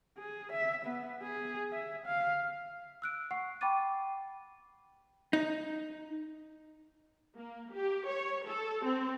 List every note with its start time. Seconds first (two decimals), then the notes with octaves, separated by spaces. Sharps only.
0.18 G#4
0.52 E5
0.85 B3
1.23 G#4
1.72 E5
2.06 F5
3.02 E6 F#6 D7
3.31 F#5 C#6 C7
3.61 G5 B5 C#6 D6 A6 D#7
5.33 D#4
7.36 A#3
7.75 G4
8.09 C#5
8.48 A4
8.85 C4